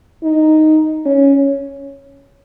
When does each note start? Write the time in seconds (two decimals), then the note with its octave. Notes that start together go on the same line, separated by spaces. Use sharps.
0.24 D#4
1.06 C#4